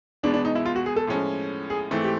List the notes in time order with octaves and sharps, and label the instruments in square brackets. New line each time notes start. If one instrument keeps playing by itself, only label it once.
[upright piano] E2 B2 G#3 B3 [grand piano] D4
[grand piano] D4
D#4
E4
F4
F#4
G#4
A4
[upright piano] A2 F3 G#3 C#4
[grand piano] G#4
[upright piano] G#2 E3 A3 C4
[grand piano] G4